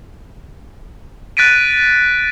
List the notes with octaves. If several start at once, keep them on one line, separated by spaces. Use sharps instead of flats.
F#6 A6 B6 D7 D#7